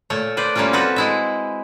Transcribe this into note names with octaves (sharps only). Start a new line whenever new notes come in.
A#2 A3 C#5
B4 C5 D5
G3 A3 A#3 C#4 E4 F4
C4 F#4 A4 B4
G#3 E4 E5